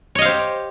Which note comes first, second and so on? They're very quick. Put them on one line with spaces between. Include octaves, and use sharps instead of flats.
C#5 D#5 F5 C5 G4